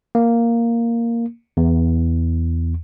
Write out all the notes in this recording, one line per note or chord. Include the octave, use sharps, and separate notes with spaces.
A#3
E2